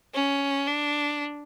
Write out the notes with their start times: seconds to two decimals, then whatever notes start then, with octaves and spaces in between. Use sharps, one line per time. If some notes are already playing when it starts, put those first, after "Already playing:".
0.15 C#4
0.67 D4